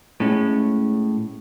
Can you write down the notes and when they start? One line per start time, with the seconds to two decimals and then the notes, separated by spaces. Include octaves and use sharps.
0.20 A2 G#3 C#4